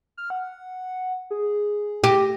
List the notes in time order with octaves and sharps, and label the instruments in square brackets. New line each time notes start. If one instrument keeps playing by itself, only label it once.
[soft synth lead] F6
F#5
G#4
[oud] G4 [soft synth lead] A#6